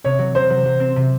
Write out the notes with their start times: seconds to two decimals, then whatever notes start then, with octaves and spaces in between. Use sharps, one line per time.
0.04 C3 C#5
0.19 F#3
0.35 F#3 C5
0.50 F#3
0.65 F#3
0.80 C4
0.96 C3